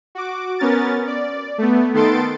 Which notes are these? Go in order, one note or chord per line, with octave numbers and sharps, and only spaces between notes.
F#4 D6
B3 C#4 A#4 A6
D5
A3 B3
D#3 B3 A4 C6 A6 D7